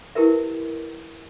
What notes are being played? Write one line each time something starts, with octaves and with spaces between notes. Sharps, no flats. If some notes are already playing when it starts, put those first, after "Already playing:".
E4 G4 A#4 B4 E5